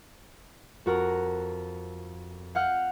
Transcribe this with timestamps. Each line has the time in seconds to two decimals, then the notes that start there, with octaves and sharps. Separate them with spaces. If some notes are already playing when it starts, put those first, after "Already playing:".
0.86 F2 F#4 A#4
2.55 F5 F#5 F6 G6